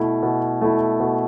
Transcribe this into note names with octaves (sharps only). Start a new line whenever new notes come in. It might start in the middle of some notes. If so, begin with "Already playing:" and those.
Already playing: B2 A3 E4
B2
A3 E4
B2